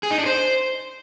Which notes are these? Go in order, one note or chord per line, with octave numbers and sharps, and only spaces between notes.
G#4
D#4
D4
C5